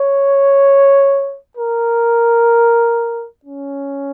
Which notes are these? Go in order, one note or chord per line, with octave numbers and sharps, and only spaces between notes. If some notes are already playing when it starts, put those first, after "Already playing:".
Already playing: C#5
A#4
C#4